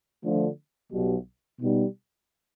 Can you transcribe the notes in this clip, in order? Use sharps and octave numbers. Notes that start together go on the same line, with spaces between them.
D3 F3 A3
B1 B2 G3
B2 G3 B3 D#4